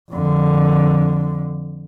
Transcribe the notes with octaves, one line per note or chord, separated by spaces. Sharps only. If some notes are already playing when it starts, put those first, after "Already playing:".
F2 D3